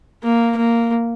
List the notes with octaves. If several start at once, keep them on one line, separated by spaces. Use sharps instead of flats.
A#3
A#3